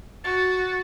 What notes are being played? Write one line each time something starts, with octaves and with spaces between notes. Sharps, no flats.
F#4 A6